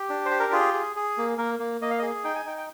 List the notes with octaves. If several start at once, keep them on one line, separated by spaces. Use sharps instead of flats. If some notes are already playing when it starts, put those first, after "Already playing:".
Already playing: G4
D4
C5
G4
A#4
F4 G#4
G#4
G#4
A#3
A#3 A#4
A#3
A#3 D#5
F5
D#5
G#4
D#4 G5
G#5
D#4 G5
G5